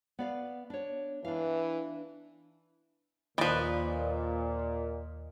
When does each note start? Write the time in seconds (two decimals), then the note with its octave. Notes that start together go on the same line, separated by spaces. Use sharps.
0.19 B3 D5 F5
0.70 D4 C#5
1.25 E3 D4 F5
3.38 D#2 A#2 E3 F3 B4 D5 D#5